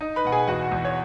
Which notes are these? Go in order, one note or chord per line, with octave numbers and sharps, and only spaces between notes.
D#4
B4 B5
B2 F#5
G#4 G#5
E2 F#4 F#5
E2
C#5